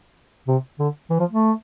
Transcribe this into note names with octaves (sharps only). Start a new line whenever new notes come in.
C3
D3
E3
F3
A3